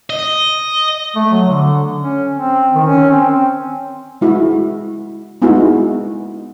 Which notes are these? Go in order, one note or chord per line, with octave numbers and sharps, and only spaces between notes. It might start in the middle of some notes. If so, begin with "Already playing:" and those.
D#5
A3
F#3
D3
C#4
C4
D#3
C#4
C4
G#3 E4 F#4
G#3 B3 D#4 E4 F#4